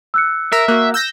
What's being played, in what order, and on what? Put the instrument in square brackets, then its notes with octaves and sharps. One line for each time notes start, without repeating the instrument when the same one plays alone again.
[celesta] E6 F#6 C#7
[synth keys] A#4 [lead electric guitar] E5
[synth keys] A#3 F#4 [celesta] F#6
[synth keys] E6 G6 A#6